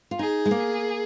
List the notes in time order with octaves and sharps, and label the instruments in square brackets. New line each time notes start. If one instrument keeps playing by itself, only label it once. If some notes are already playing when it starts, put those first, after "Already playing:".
[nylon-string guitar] F4
[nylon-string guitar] D#4 [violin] G#4
[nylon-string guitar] G#3
A#3